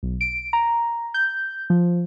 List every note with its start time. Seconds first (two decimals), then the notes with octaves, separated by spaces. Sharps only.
0.03 B1
0.21 D7
0.53 A#5
1.14 G6
1.70 F3